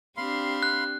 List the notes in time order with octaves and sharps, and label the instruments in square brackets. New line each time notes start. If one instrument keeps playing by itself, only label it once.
[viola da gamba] C4 D4 G4 [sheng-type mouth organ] F5 B5 C6
[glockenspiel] F#6